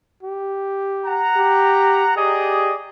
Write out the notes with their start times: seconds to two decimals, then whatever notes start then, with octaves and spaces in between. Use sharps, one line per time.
0.23 G4
1.06 F#5 A#5
1.37 G4
2.17 G4 G#4 D5 D#5